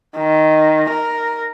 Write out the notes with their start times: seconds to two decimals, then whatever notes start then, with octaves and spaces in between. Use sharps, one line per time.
0.16 D#3
0.89 A#4